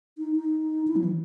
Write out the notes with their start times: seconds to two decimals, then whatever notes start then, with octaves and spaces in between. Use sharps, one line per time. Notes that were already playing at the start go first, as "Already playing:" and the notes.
0.18 D#4
0.36 D#4
0.87 E4
0.96 F#3
1.04 E3